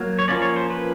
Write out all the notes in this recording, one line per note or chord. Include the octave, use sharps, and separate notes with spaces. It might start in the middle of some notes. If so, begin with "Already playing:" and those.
Already playing: F#3 A#3
C#5
F3 A#3 C#4 D5
C#5
C5
B4